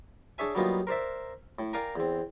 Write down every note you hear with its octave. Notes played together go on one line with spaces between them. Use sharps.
D4 G#4 C#5 E5 G#5
F#3 G3 A#3 B3 D#4 F4
A#4 C5 D5 E5
A2
A#4 D5 F5 G5 G#5 A#5
E2 C4